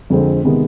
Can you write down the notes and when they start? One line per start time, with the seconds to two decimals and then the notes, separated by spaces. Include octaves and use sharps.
0.10 F2 D3 G#3 C4
0.45 C3 D#3 G#3 B3